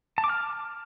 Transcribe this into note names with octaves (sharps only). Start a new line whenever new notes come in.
A5
D6
F6